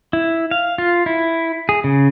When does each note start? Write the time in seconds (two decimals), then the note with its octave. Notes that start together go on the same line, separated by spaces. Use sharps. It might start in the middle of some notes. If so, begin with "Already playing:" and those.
0.13 E4
0.51 F5
0.78 F4
1.06 E4
1.69 G#4
1.84 C#3